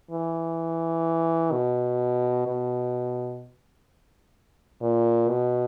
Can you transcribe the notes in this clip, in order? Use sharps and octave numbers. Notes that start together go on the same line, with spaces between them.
E3
B2
B2
A#2
B2